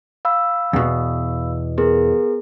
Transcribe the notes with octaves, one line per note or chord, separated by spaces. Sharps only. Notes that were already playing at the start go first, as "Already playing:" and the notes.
F5 B5 E6
E2 B2
B3 G#4 A#4